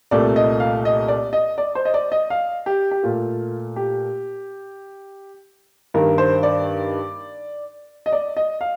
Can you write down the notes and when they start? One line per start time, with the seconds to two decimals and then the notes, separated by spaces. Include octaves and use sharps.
0.11 C2 A#2 A3 D5
0.36 D#5
0.60 F5
0.85 D#5
1.08 D5
1.33 D#5
1.58 D5
1.75 C5
1.85 D#5
1.94 D5
2.12 D#5
2.30 F5
2.66 G4
2.91 G4
3.03 A#2 A3 F4
3.76 G4
5.94 G2 D#3 A#3 A#4
6.18 C5
6.43 D5
8.06 D#5
8.12 D5
8.37 D#5
8.61 F5